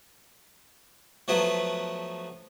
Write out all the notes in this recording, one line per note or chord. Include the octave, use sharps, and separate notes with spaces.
F3 F#3 A3 B3